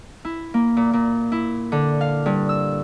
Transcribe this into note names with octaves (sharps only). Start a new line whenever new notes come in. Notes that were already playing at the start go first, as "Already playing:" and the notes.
E4
A#3
A#2
A#2
E4
D3
F5
G2
E6